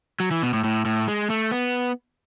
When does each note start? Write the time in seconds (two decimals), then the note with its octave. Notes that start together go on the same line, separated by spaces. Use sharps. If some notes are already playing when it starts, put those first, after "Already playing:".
0.20 F#3
0.31 E3
0.43 B2
0.54 A2
0.64 A2
0.85 A2
1.08 G#3
1.30 A3
1.51 B3